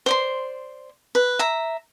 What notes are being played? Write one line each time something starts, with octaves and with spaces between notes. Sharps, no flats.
C5 D5 C6
B4
E5 A#5